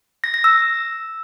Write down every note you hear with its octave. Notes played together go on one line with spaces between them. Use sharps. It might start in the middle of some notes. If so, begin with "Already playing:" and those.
A#6
A#6
E6